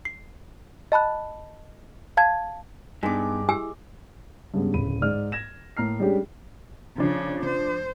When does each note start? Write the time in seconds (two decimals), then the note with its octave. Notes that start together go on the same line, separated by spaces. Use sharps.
0.05 C7
0.92 D#5 A5 B5 F#6
2.17 F5 A5 G#6
3.03 G2 G#3 B3 D4 D#4 D6
3.49 E4 G4 G#5 E6
4.54 G2 C#3 G#3 B3
4.74 D1 C#3 B5 D#7
5.02 G#2 D#4 D5 F6
5.32 G#6 A#6 E7
5.77 A2 A#3 A#5 F6 C7
6.00 G3 G#3 C#4 D4 G4 G#4
6.98 C#3 F3 D4
7.46 C5